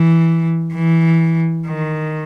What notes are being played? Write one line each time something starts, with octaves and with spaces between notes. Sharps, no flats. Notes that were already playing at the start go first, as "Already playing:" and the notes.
Already playing: E3
E3
D#3